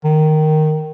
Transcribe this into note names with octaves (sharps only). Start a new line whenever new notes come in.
D#3